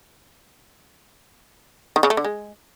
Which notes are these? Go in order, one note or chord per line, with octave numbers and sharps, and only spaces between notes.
D#3
C#3
A3
D3
G#3